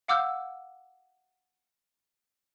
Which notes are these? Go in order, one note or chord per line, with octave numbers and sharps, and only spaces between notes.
F5 F#5 D6 E6 F6 G6